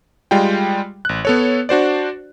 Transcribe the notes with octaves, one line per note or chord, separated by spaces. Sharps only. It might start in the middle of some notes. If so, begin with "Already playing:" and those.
G3 G#3 F4 G5
A1 F#6
B3 A4 C#5
D4 F#4 C5 D5